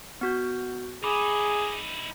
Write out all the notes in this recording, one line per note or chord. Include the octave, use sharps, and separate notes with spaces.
B3 F#4 G6
D#4 E4 G#4 B5 D6